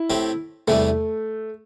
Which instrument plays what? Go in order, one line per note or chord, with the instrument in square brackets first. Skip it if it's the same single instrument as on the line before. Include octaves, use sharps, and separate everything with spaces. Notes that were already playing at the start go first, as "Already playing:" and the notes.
Already playing: [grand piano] E4
[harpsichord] A2 A3 C4 G4
[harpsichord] E2 C3 E3 G3 [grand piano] A3